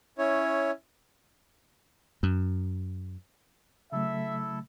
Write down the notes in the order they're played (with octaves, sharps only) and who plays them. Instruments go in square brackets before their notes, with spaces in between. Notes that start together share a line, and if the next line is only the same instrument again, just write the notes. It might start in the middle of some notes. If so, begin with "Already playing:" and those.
[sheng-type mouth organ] C#4 E4 C#5
[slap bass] F#2
[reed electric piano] C#3 F#3 A3 [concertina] E4 A4 [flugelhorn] E5